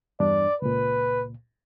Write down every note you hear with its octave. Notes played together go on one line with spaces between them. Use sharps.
E2 G2 D4 D5
C#2 A#2 B4